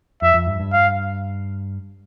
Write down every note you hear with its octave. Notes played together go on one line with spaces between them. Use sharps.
F2 E5
F2
G2
G2
F5